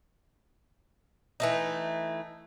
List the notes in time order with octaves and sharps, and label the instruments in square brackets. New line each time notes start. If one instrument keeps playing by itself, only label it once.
[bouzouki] E3 A3 D#4